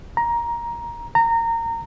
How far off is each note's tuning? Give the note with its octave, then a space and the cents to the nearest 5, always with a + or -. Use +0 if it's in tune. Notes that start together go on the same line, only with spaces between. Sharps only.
A#5 +15
A#5 -20